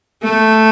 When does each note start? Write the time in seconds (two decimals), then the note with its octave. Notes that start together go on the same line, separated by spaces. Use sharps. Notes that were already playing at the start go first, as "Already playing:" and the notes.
0.23 A3